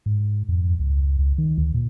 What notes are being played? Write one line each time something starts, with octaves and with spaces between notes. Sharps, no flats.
G#2
F2
C#2
C#2
D#3
D2
A#2